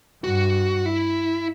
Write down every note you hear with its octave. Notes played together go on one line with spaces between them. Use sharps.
G2 F#4
E4